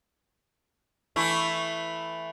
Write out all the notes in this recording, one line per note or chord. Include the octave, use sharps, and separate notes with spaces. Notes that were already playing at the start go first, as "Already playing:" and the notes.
E3 A3 E4